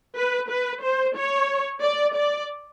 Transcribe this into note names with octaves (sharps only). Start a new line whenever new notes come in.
B4
B4
C5
C#5
D5
D5